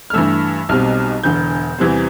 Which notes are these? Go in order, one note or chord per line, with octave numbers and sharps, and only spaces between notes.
F6
G2 E3 A3 E6
B1 B2 G3 C4 F6
E1 E2 D3 G6
E2 C3 E3 G3 C4